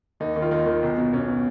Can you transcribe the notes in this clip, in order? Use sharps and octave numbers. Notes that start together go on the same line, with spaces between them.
D#2 D#4
D#3
F4
D#2 D#4
D#3
B1
B2
B1 C#4
B2